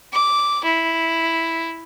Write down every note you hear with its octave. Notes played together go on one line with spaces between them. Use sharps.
D6
E4